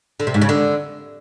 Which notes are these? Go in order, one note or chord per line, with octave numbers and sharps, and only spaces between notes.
D3
C3
G#2
C#3
D3